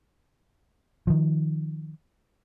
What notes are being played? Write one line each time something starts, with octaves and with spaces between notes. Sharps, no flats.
D#3 F3